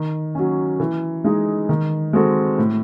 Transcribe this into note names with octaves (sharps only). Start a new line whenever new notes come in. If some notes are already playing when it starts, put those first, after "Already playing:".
Already playing: D#3
F#3 C#4
E3
G#3 D#4 G#4
D#3
G#3 C4 F#4 A4
A2